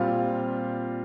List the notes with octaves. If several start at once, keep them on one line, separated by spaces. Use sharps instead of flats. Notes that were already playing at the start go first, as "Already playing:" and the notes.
Already playing: A#2 G3 C4 F4 F5